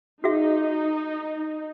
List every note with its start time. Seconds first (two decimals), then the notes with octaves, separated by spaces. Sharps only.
0.24 D#4 F#4 G#4 E5